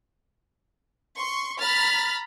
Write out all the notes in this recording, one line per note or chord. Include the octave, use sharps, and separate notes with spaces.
C6 C#6
A#5 B5 F6 A6 B6